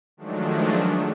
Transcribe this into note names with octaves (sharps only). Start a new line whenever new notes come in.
D#3 F3 F#3 G#3 A3 D4